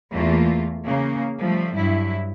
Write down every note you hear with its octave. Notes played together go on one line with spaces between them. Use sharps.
E2 A3 A#3 F4
C#3 A#3
F3 G3 A3
G2 F#3 E4